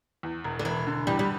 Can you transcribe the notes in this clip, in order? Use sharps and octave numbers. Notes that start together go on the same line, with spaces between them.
E2
E1
D3
E1 E3
D3
E2 G3
G3